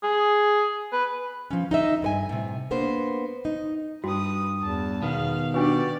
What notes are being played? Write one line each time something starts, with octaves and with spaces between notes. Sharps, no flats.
G#4
B4
F3 C#4
D#4 D#5 E5
G2 B4 G#5
A2 C3
A#3 B3 D4 C5
D#4
G2 F#4 B4 D#6
E2 A5
B2 D#3 B3 F5
D4 F#4 G4 B4 D5